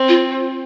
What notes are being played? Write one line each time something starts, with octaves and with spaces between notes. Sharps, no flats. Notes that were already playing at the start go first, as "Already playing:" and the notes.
Already playing: C4
F4